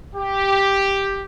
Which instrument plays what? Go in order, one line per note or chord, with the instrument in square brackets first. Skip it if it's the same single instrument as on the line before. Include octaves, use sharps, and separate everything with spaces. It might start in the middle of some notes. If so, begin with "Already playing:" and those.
[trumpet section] G4